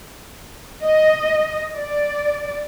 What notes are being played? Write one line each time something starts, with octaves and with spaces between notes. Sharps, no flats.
D#5
D5